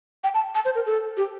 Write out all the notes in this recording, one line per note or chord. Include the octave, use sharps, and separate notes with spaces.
G5
A5
A5
C5
A#4
A4
G4